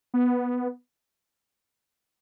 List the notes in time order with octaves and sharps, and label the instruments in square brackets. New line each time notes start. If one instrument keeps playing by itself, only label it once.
[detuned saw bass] B3